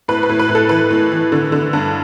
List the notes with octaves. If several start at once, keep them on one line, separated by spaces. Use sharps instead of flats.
A2 B4
B4
A2
B4
A2
A4
E3 B4
A2
E3
D3
D3
G2